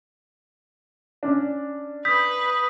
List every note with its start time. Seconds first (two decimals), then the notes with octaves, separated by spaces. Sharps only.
1.23 C#4 D4
2.05 B4 D#6 G6 B6